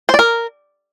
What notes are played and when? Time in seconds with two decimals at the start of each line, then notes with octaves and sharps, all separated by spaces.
0.09 C5
0.14 D5
0.19 A#4